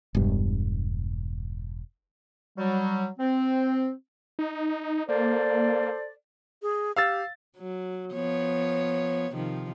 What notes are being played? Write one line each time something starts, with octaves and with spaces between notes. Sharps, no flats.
E1 G2
F#3 G3
C4
D#4
A#3 A4 C5 D5
G#4
G4 F5 E6 A6
F#3
F3 B3 C#5
C3 D#3 F3